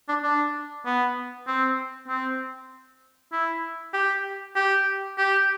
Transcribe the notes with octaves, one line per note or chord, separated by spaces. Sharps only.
D4
D4
B3
C4
C4
E4
G4
G4
G4